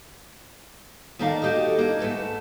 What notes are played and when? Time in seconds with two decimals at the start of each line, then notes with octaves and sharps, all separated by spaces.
1.19 D#2 D#3 A3 A#4 D5 F5
1.42 F#4 G4 A4 D#5
1.78 A#3 D4 E4
1.99 G#2 A3 B4 A5